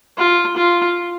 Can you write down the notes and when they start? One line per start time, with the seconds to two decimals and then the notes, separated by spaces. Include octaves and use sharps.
0.18 F4
0.56 F4